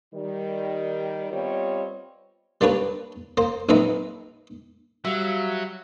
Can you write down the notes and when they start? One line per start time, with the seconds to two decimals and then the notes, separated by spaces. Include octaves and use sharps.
0.13 D#3 G3
1.32 G3 B3 C4 F4 C#5 D#5
2.61 G3 A#3 D4 B4 C#5
3.37 A#3 C5
3.69 A#1 F#3 C4 D#4 B4 E5
5.05 F#3 G3 E5 F5